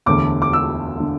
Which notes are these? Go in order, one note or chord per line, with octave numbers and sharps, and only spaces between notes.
E1 D2 D3 D6
D6
E6
D3